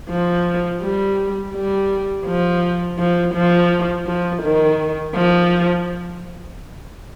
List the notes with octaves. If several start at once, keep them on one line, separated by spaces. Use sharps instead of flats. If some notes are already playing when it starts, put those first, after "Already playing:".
F3
G3
G3
F3
F3
F3
F3
D#3
F3